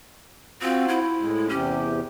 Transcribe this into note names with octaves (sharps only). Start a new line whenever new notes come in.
C4 F4 F#4 C5
E4
A2 G#3
E2 C3 C#4 G4